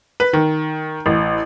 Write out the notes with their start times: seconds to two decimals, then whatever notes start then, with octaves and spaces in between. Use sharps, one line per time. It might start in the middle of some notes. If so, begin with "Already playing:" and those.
0.20 B4
0.33 D#3
1.06 A1